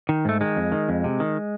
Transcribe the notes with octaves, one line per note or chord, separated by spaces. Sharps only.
D#3
G#2 A3
D#3 G#3
F2
D#3
F2
C3
D#3